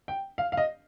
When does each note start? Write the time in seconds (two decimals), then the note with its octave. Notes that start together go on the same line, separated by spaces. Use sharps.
0.08 G5
0.38 F5
0.52 F5
0.57 D#5